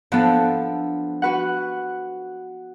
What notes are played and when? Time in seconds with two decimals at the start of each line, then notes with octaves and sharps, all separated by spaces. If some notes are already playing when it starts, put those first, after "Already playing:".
0.12 F3 B3 D4 A4
1.22 F#4 B4 F#5